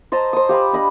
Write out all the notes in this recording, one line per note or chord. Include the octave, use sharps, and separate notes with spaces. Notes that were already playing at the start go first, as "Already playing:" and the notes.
C5 D#5 A5 A#5
C5 D#6
G4 F5 G#5 B5
D4 D#5 B5